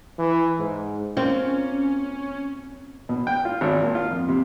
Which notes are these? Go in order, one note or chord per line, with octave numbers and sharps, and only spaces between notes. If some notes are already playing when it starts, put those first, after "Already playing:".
E3
G#2
A#3 C4 C#4 F4
B2
G5
F4
G#1
A#2
F4
F2
C3